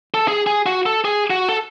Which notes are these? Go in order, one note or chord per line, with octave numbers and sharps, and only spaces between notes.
A4
G#4
G#4
F#4
A4
G#4
F#4
A4